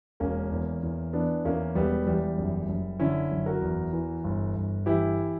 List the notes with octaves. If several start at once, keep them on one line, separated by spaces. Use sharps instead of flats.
E1 A#3 C#4
E2
E2
E3 B3 D4
E2 A#3 C#4
E1 G3 B3
E2 G3
F#1
F#1
D3 C#4 E4
F#1
F#4 A#4
E2
E3
G1
G1
E3 E4 G4